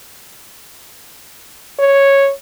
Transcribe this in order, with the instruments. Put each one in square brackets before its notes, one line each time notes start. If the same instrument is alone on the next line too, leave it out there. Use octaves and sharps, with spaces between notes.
[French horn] C#5